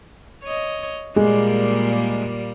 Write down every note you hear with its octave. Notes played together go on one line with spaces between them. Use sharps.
C#5 D#5
A#2 G3 G#3 A#3